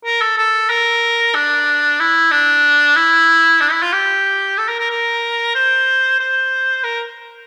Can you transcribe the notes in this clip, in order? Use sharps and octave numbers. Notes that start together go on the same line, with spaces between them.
A#4
A4
A4
A#4
D4
E4
D4
E4
D4
E4
F4
G4
A4
A#4
A#4
A#4
C5
C5
A#4